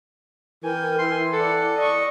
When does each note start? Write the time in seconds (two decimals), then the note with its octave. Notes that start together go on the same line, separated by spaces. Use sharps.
0.63 E3 A#4 G5 G#5
0.99 E4 C6
1.33 A4 D5 F#5
1.76 D5 D#5 C#6